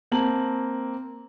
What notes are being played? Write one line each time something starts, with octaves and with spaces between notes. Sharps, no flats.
A#3 C4 A5 F#7